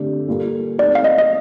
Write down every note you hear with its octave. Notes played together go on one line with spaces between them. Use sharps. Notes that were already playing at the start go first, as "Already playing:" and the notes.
Already playing: D3 A3 C4 G4 D5
A#2 G3 A#3 F4 A4
A3 C4 D#4 D5
F5
D#5
D#5